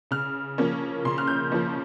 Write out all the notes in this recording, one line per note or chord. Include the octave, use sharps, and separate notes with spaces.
C#3 F6
F3 A#3 C#4
C#3 C6
F6
G6
F3 A#3 C#4